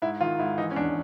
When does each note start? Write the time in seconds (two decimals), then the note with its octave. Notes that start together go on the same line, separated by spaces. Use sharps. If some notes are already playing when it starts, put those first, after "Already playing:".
0.02 G#2 E4
0.21 D#3 F4
0.39 G#2 E4
0.58 E3 D#4
0.71 C#4
0.76 E2 D4